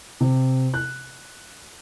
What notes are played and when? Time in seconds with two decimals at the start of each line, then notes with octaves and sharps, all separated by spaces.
0.20 C3
0.74 F#6